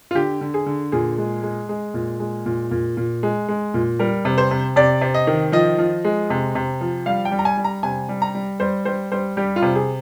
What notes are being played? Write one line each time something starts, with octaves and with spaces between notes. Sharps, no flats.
F4
D3 G4
D3
G#4
D3
A#2 G#4
G#3
G#3
G#3
A#2
G#3
A#2
A#2
A#2
G#3
G#3
A#2
G3 A#4
C3
C5
C3
C3 D5
C3
D#5
D#3
F3 D#5
F3
G#3
C3
C3
F3
G3 F5
G5
G3
A#5
G#5
G3
A#5
C3 G#5
G3
A#5
G3
G3 C5
G3 C5
G3 C5
G3 G4
F4
C3
G#4